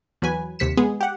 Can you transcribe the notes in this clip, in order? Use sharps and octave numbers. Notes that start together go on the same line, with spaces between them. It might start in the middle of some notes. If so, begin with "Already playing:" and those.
E2 F#3 B4 G#5
D#2 C3 B6 C#7 E7
G#3 B3 G#4
G4 F#5